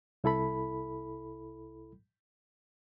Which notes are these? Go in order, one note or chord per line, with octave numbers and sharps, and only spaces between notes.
C2 E4 A4 B5